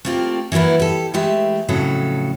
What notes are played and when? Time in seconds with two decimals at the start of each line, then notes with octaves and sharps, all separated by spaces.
0.05 A3 A#3 C4 F4 G4
0.52 E3 F#3 A#3 B3 E4
0.80 G4 A4
1.14 E3 G#3 A3 G4 E5
1.68 F2 A2 C#3 F#3 A4